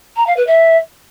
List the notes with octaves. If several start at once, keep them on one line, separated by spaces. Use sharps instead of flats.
A#5
F5
B4
E5